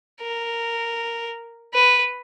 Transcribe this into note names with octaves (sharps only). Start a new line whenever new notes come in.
A#4
B4